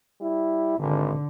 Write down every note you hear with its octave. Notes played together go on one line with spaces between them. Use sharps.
G3 E4
G#1 D3